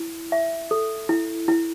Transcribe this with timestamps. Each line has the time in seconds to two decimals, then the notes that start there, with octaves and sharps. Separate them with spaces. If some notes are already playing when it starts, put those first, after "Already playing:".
Already playing: E4
0.32 E5
0.71 A4
1.09 E4
1.48 E4